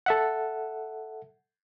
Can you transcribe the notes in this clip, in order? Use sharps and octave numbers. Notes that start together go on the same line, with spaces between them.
A4 E5 F#5